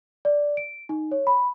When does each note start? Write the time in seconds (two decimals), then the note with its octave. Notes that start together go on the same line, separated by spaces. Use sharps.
0.25 D5
0.57 D7
0.89 D#4
1.11 C#5
1.27 B5